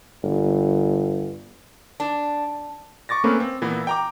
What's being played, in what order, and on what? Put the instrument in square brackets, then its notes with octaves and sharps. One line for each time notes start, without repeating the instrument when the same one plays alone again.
[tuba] G1
[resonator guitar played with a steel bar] D4
[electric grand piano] C#6 D6 A6 A#6
A3 A#3 C4 C#4 A#4 B4
C4
A#2 E3 B3 E4
G5 A#5 D6